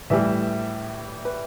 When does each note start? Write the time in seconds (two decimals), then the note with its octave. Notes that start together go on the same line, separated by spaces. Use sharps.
0.10 A2 E3 G3 E5
1.25 B4